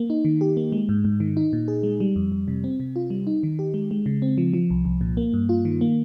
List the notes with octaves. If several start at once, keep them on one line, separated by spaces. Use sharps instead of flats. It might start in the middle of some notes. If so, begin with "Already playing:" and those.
Already playing: A#3
D#4
D#3
G4
A#3
G#3
G#2
G#2
D#3
D#4
A#2
G#4
G#3
G3
F2
F2
C3
C4
C3
F4
G3
D#4
D#3
G4
G#3
G#3
C#3
C4
F3
F3
C2
C2
A#2
A#3
G2
F4
D#3
A#3